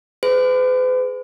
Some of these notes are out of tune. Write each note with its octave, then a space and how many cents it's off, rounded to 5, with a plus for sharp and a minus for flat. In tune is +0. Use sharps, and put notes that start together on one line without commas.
G#4 +10 B4 +45